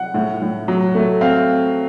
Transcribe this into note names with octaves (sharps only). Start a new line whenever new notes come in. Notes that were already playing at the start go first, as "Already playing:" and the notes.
Already playing: F#5
A2
A2
F#3
A3
C4 F5